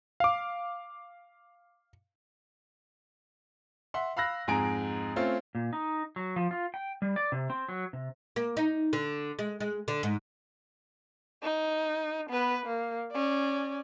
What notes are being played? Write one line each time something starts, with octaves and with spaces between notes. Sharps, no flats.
F5 D6
E5 F#5 C6
F5 B5 E6 F#6 A#6
F2 G#2 G#3 G#5 A#5 D7
A3 C4 C#4 F4
A#2
D#4
F#3
F3
F4
G5
G3
D5
C3
C4
F#3
C3
A#3
D#4
D3
G#3
G#3
D3
G#2
D#4
B3 B4
A#3
C#4 D5